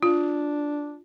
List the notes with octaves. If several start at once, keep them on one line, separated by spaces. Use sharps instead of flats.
D4 F4